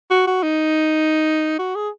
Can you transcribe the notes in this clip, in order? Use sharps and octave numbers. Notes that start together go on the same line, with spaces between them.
F#4
F#4
D#4
F#4
G#4